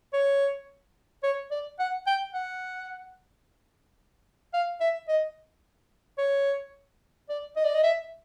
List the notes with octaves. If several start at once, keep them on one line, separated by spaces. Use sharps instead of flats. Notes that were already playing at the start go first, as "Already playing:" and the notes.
C#5
C#5
D5
F#5
G5
F#5
F5
E5
D#5
C#5
D5
D#5
D5
D#5
E5